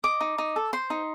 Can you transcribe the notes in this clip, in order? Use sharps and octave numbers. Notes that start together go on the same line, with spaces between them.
D#5 D6
D#4
D#4
A4
C5 C6
D#4